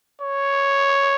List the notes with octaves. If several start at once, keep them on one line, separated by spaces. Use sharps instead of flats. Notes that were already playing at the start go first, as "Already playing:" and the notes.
C#5